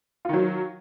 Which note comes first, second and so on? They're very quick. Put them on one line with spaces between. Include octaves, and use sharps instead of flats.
F4 D#3 F#3